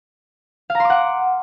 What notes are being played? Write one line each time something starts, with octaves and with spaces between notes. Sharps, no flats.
F5
A#5
C6
D6
F#5